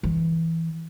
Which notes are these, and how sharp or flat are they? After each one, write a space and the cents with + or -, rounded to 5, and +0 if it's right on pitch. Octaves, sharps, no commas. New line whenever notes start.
E3 -10